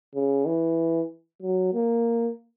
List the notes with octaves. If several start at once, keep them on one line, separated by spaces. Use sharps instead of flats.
C#3
E3
F#3
A#3